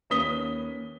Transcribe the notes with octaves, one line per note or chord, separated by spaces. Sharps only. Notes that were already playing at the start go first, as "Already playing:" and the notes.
D#2 C#4 B4 D#6 B6 G7